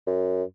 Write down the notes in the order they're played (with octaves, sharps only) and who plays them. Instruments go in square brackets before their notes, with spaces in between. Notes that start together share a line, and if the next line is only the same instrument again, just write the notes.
[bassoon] F#2